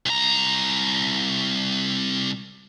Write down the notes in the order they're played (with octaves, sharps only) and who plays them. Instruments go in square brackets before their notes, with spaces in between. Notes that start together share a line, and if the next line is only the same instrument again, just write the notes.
[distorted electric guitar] C2 A#5